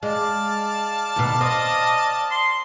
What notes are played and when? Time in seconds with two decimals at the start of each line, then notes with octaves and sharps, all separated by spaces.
0.03 G#3 D5 F5 A5
1.16 D#2 B2
1.41 C4 D#5
2.31 C6